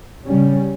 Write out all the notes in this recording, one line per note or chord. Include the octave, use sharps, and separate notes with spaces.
C#3 G3 C#4